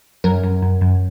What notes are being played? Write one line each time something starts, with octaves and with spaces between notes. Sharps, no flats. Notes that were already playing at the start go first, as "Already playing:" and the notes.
F#2 A#4
F#2
F#2
F#2